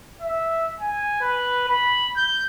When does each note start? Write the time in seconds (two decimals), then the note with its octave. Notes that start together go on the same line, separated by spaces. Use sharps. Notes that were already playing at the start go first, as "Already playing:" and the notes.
0.21 E5
0.80 G#5
1.21 B4
1.68 B5
2.16 G6